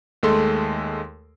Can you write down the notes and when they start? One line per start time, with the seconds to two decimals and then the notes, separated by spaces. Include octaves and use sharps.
0.23 D#2 G#3 A3 A4 C6